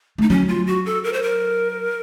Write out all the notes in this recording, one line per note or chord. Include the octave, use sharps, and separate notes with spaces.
A3 D#4
F#3 C#4
F4
F#4
A4
A#4
C5
A#4